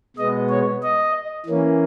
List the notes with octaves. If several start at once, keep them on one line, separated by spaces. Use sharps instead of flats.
B2 G#3 B3 D#5
C#5
D#5
E3 A#3 C#4